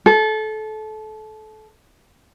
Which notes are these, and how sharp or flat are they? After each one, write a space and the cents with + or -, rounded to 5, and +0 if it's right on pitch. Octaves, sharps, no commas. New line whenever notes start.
A4 -25